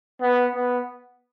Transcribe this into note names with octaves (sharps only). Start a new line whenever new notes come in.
B3
B3